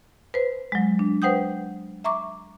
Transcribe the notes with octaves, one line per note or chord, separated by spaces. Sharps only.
B4 C5
F#3 G#3
D4
B4 C5 F#5 G5 D#6 G6
E5 A#5 C#6 D6